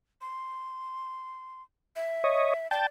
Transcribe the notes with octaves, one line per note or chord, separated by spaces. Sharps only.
C6
E5
C#5 D#5
D5 G5 A5